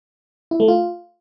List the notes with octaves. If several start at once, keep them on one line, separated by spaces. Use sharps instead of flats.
E4
A3
F4